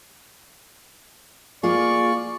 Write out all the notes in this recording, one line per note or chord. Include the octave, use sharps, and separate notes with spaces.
A#3 F4 G#4 D5 C#6